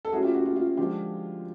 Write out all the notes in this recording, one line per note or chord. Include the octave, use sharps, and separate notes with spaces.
A4
F#3 A3 C#4 E4 F#4 G#4
F4 G4
F#4
F4
F4
D3 F3 G#3 F4 G4